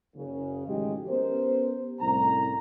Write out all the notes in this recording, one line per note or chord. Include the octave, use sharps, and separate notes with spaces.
F#1 C#3
A1 D#3 F#3 G#3 G4 D#5
B3 C#4 G4 A#4 C5
C2 A2 C#4 A#5